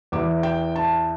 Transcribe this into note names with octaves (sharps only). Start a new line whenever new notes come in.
E2 E3 D6
G5
A5